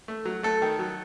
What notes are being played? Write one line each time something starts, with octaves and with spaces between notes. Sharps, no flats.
A3
F#3
A3 A4
D#3
F#3